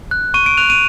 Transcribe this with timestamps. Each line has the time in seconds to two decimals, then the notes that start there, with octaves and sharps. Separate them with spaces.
0.11 F#6
0.34 C#6 D#7
0.46 D7
0.57 F#6 F7
0.70 D#7